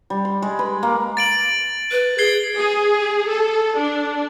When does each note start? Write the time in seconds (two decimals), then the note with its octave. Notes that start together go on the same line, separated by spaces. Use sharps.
0.10 G3
0.25 C6
0.42 G#3
0.59 B4
0.83 A#3
1.17 A6 D7 F#7
1.91 B4
2.18 G#4 G#6 C7 G7
2.56 G#4
3.28 A4
3.77 D4